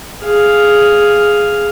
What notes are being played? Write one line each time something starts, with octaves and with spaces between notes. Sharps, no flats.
G#4 F5